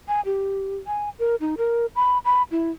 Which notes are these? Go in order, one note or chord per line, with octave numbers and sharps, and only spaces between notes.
G#5
G4
G#5
A#4
D#4
A#4
B5
B5
E4